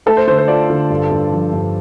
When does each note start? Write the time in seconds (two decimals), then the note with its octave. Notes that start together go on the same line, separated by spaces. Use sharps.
0.06 A3 A4
0.17 C5
0.27 D3 C5
0.38 C5
0.48 F4 D5
0.70 D3
0.90 G2
1.11 G2
1.32 F3
1.53 G2